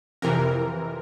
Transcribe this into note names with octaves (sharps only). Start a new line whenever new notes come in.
F2 C3 E3 A#4